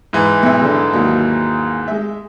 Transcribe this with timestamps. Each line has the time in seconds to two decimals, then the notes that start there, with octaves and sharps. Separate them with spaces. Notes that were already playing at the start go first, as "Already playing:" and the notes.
0.13 G#2 E3
0.43 B1 E5
0.61 D3 G#3
0.93 D#2 D#3 F#3
1.88 G#3 E5